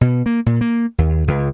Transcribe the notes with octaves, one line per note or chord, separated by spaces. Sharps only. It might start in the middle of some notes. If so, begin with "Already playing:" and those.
B2
A#3
A#2
A#3
D#2
C#2